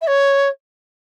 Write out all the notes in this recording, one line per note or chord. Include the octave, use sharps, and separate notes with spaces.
E5
C#5